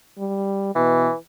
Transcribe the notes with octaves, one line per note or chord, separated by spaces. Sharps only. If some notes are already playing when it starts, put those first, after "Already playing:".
G3
B2 E3